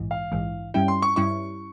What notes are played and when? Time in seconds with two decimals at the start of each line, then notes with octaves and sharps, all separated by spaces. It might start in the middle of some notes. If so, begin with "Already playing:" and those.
Already playing: A#1 G#2 E3
0.11 F5
0.32 A#1 G#2 E3
0.74 G2 G3 C#4 E4 G5
0.88 C6
1.02 C#6
1.16 G2 G3 C#4 E4 C#6